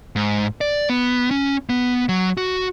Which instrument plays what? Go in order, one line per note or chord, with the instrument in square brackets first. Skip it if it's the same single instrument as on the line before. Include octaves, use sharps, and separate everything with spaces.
[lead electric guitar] G#2
D5
B3
C#4
B3
F#3
F#4